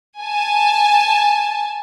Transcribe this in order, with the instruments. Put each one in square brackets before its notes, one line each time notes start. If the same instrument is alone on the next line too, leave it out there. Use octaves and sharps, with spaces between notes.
[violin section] G#5 A5